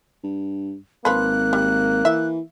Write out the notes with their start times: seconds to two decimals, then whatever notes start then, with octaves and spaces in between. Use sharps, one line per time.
0.24 G2
1.05 G#1 F3 A#3 B4 F#6
1.53 G3
2.05 E3 E5